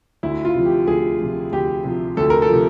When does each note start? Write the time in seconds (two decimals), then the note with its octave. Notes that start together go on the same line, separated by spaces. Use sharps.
0.23 D2 E4
0.45 F4
0.55 C3 F3
0.65 G4
0.87 D2 G#4
1.20 C3 F3
1.52 D2 G4
1.84 C3 F3
2.17 D2 A4
2.30 A#4
2.42 A4
2.49 C3 F3